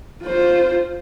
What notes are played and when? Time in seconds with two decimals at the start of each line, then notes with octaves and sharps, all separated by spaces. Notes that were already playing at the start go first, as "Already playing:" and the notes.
0.23 F4 C5